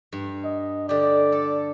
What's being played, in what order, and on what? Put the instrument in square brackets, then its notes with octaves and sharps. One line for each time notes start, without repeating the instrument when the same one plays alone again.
[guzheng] G2
[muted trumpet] D#5
[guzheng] D3 G4 [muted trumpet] D5
[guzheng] A4